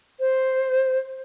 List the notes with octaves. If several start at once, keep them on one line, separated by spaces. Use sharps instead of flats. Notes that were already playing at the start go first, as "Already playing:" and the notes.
C5